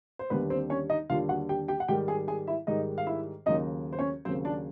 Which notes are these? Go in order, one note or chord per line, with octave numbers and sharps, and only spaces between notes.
C5
D#2 D3 G3 B3 B4
C4 C5
C#4 C#5
D#4 D#5
D#2 D3 G3 F4 F5
F#4 F#5
G4 G5
G4 G5
F#5
G#2 D#3 G3 G4 G5
G#4 G#5
G#4 G#5
E4 E5
G#2 D#3 G3 D#4 D#5
F5
E4 E5
D#2 C#3 F#3 D#4 D#5
C5
C#4 C#5
D#2 C#3 F#3 C4 C5
D4 D5